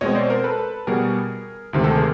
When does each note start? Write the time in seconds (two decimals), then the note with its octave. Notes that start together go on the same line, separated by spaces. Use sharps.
0.01 B2 G#3 C4 C#5 D#5
0.15 C5 D5
0.30 A#4 C5
0.44 A4 B4
0.87 B2 G3 B3 G#4 A#4
1.73 D2 C3 D#3 G#3
1.84 G4 A4
1.95 G#4 A#4